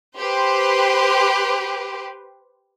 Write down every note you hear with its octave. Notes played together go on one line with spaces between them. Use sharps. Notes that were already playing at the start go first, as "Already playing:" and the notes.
G4 B4 C5 C6